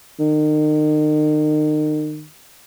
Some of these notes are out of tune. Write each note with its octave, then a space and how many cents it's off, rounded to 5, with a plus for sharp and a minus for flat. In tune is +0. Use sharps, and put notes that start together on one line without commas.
D#3 -35